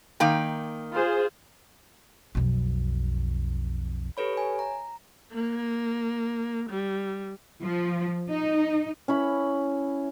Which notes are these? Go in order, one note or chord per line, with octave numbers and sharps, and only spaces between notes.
D#3 A#3 G5
F4 G#4 C5
B1 F2
G4 A4 B4 C#5 B5
C#5 G#5
A#5
A#3
G3
F3
D#4
C#4 E4 B5